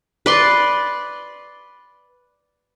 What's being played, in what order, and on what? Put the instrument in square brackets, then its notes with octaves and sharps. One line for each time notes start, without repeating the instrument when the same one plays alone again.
[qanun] B4 D5 C6